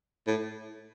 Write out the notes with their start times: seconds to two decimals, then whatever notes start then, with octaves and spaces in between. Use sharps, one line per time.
0.27 A2